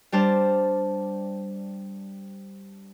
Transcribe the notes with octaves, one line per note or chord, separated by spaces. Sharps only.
G3 D4 C5 A5 F6